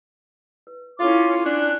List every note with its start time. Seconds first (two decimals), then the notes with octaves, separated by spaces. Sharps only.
0.67 B4
0.99 C#4 E4 F4 A4 C5 D6
1.45 C#4 D4 F#6